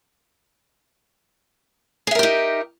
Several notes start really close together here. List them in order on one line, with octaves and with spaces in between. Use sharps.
G#4 E5 A#4 G4 D#4